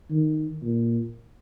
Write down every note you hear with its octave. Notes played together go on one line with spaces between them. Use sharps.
D#3
A#2